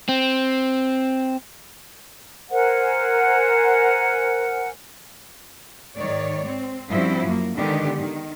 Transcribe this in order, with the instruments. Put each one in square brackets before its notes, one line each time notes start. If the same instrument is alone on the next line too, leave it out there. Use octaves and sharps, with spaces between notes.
[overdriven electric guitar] C4
[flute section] A#4 C5 F#5 G#5
[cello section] G#2 D#3 C#5 D5
C4
G2 F3 C4 C#4 E4 F#4
F#2 A#3
D3 D#3 G#3 B3 G4
D#3